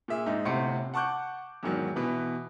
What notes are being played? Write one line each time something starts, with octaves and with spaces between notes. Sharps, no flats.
A#2 G#4 E5
G#2 D#4
G1 A2 C3 F#5 C6 C#7
F#5 A5 C#6 D6 F#6 G6
E2 G#2 D#3 F#3
B2 E3 B4